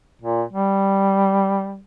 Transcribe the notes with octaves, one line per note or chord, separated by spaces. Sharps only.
A#2
G3